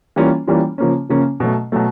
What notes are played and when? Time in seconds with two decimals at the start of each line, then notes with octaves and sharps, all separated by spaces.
0.16 E3 G3 A#3 C#4 F4
0.47 E3 G3 A#3 C#4 F4
0.78 C#3 F3 A#3 C#4
1.09 C#3 F3 A#3 C#4
1.40 B2 F#3 A3
1.72 B2 F#3 A3